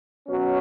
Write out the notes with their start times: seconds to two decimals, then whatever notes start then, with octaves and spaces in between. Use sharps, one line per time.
0.28 B2 F#3 C#4